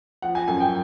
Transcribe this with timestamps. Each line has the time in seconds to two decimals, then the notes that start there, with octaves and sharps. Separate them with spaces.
0.22 F3 F#5
0.35 G#5
0.48 F#2 G#5
0.60 G5